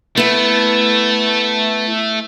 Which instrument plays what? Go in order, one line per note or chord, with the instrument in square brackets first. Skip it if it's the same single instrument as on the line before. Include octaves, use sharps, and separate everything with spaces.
[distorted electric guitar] A3 [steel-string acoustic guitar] B3 E4